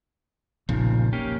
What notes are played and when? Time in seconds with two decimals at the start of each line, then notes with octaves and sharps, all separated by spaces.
0.69 F#1 B1 A#2 C#3 F3
1.13 A#3 C#4 G4